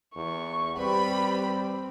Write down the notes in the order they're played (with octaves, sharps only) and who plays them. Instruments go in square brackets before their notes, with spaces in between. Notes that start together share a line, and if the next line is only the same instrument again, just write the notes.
[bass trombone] E2 [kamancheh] C#6
[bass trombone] G3 [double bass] C4 [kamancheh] G4 B4 [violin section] B5